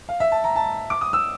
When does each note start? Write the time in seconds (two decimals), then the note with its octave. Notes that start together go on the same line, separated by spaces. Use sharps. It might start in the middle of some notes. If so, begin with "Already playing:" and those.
0.09 F5
0.20 E5
0.32 A5
0.44 A#5
0.56 A5
0.90 D6
1.01 D#6
1.13 E6